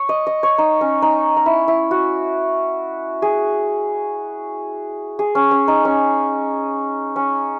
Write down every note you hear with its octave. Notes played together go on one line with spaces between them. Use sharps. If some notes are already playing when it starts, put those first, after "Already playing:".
Already playing: C#5
D#5
D#5
C#5
D#4
C#4
D#4
D#4
E4
E4
F#4
G#4
G#4
C#4
C#4
D#4
C#4
C#4